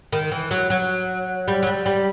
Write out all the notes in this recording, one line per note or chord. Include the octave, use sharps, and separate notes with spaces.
D#3
E3
F#3
F#3
G3
F#3
G3
G3